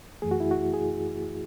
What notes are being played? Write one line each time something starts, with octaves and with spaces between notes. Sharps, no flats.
F#2 E3 A3 G#4
F#4
E4
F#4
G#4